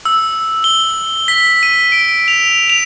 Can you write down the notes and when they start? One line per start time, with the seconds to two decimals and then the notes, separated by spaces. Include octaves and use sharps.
0.05 E6
0.64 G7
1.28 B6
1.63 D#7
1.92 D7
2.28 F7
2.70 F7